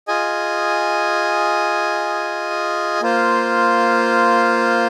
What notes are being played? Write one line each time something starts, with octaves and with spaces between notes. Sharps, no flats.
F4 G#4 D#5 G#5
A#3 F4 C5